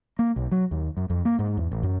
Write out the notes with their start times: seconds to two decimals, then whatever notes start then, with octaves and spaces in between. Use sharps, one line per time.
0.19 A#3
0.36 B1
0.52 F#3
0.71 D#2
0.97 F#2
1.10 F2
1.25 A#3
1.39 G#2
1.57 E2
1.71 A1
1.83 F#2